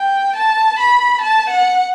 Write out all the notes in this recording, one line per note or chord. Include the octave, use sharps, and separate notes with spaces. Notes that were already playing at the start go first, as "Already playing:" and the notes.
Already playing: G5
A5
B5
A5
F#5